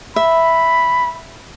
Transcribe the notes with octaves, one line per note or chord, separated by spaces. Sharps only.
E5 B5